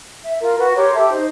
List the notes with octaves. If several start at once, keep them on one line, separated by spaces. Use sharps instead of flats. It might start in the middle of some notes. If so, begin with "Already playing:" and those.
E5
F4 A#4
F#4 B4
G4 A#4 C#5 C6
G4 A4 E5
D#4 C5